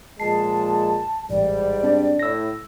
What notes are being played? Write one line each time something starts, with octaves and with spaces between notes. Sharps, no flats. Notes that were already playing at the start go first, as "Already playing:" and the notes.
A#2 F3 G#3 A5 C7
A1 G#2 G3 D5
C4 D4
A2 E6 A#6